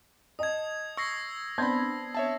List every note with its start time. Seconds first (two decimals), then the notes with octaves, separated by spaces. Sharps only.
0.39 D#5 A5 D#6 G#6
0.97 C#6 E6 A#6 C7
1.58 B3 C4 D4 A5 B5 C6 G6 G#6
2.15 C#5 E5 A5